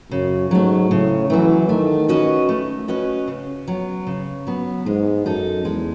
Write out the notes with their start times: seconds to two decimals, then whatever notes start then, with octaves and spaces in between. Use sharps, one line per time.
0.11 F#2 C#3
0.51 G#2 F#3 A3
0.90 A2 C#3
1.30 E3 F#3 A3
1.69 D#3 A3
2.09 C#4 F#4 B4 D#5
2.49 A3
2.88 C#4 F#4 B4 D#5
3.28 C#3
3.68 F#3 B3
4.07 C#3
4.47 F#3 B3
4.86 G#2 G#3
5.26 F#2 D#4 A4
5.65 E2 G#3